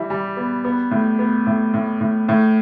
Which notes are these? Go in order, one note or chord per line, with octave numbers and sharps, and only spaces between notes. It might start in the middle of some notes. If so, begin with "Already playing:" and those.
Already playing: E3 G3 E4
G3
B3
B3
A2
B3
A2
A2
A2
A2